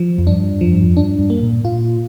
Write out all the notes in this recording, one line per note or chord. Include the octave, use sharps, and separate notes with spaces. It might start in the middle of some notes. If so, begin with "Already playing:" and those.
Already playing: F3
F2
G2 D4
F2 F3
G2
F2
G2 D4
G2
A#3
A#2
A#2 F4